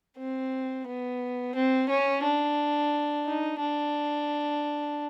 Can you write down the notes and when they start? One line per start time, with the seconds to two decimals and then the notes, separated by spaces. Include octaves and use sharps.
0.18 C4
0.87 B3
1.54 C4
1.89 C#4
2.23 D4
3.26 D#4
3.60 D4